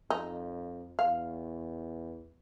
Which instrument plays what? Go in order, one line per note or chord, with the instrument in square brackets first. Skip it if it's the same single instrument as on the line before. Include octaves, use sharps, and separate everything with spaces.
[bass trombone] F2 [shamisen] D#4
[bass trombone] E2 [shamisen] F5